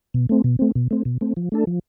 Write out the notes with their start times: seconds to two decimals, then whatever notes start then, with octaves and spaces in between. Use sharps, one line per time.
0.14 B2
0.29 A3 C4
0.44 B2
0.59 A3 C4
0.75 B2
0.91 A3 C4
1.05 B2
1.21 A3 C4
1.37 F3
1.52 A3 D4 A4
1.67 F3